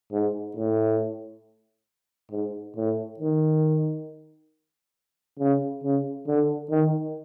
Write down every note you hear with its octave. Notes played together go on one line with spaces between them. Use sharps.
G#2
A2
G#2
A2
D#3
C#3
C#3
D3
D#3